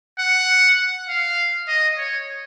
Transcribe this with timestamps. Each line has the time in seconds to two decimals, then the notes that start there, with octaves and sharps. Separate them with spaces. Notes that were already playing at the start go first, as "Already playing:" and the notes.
0.19 F#5
1.09 F5
1.68 D#5
1.98 C#5